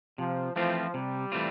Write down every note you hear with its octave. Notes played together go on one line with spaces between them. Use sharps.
C3 F3
E3 F3 A3 C4 F4
C3 G3
E3 A3 C4 F4